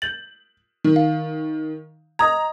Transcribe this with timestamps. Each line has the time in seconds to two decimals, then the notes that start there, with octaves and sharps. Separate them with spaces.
0.02 G6 A6 F#7
0.84 D#3
0.96 F5
2.19 D#5 A#5 D#6 G#6